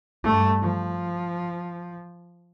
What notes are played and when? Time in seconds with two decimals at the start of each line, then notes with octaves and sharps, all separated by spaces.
0.24 G2 A3
0.62 F3